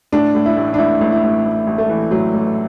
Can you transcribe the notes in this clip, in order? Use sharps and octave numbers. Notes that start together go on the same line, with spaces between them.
A2 D4
A2
E4
A1
D4
A1 E4
A1
E4
A1
A1
A1
A3
E3
A2 F#3
A1